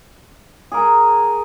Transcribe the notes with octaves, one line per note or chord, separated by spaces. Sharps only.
G#4 A#4